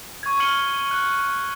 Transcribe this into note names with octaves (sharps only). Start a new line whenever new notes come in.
C#6 G#6
F6 G#6 C#7 D#7 F#7 G7
F#6